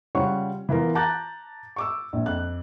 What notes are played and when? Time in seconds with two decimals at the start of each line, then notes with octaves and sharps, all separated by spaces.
0.15 C#3 G3 F4 C#5 F#5 C#6
0.69 E3 B3 F4 A#4
0.95 A5 A#5 D6 F#6 G6 A6
1.76 C#6 D6 E6
2.13 A#1
2.26 F2 F#6